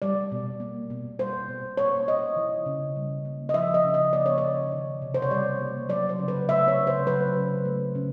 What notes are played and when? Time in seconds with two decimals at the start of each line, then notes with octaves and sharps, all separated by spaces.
0.02 G3 D5
0.32 B2
0.60 A#3
0.90 B2
1.19 G3 C5
1.49 B2
1.77 A#3 C#5
2.08 B2 D#5
2.36 E3
2.66 C#3
2.96 G3
3.25 A#3
3.49 D#5
3.54 F3 E5
3.74 D#5
3.84 C#3
3.94 D#5
4.13 A#3 D5
4.26 C#5
4.38 C#3 D5
4.72 D#3
5.02 C3
5.14 C5
5.22 C#5
5.31 G3 D5
5.60 A#3
5.89 F#3 D5
6.09 C5
6.19 C#3
6.28 B4
6.49 A3 E5
6.68 C#5
6.78 C#3
6.87 C5
7.07 F#3 B4
7.37 C#3
7.65 A3
7.95 C#3